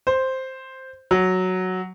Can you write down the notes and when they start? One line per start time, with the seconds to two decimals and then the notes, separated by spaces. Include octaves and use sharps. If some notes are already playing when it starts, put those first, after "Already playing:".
0.07 C5
1.11 F#3